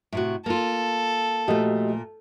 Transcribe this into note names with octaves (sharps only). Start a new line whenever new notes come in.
A2 C3 F#4
A#3 F4 A4
A#2 F3 A3 F#4 G4 D#5